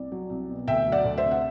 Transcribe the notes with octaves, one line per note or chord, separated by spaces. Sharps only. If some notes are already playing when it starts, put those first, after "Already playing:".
Already playing: C2 D5
F#3
C2
B2
D2 E5 G5
F#3
D5 F#5
D2
C5 E5
C3
F#5